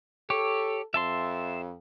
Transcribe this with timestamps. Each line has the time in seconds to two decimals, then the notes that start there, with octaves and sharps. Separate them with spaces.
0.30 G4 A4 C#5
0.94 F2 E5 A5 C6